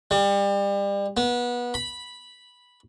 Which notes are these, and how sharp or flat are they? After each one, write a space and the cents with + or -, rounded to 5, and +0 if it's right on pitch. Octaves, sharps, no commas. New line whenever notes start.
G3 +30
B3 -25
B5 -5